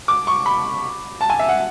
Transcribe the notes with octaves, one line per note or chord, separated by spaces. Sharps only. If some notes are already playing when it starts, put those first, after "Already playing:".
D6
C#6
B5
A5
G#5
E5
F#5